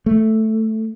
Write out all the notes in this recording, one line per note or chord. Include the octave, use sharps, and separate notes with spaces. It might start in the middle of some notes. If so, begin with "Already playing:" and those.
A3